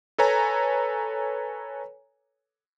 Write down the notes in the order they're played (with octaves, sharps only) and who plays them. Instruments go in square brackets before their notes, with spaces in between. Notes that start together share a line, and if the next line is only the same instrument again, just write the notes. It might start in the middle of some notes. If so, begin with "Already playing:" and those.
[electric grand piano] A4 B4 C#5 G#5 A#5